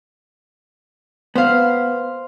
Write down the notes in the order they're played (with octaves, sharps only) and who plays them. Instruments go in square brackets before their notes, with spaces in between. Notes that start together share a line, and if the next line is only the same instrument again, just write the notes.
[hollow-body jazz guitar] B3 [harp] C5 F5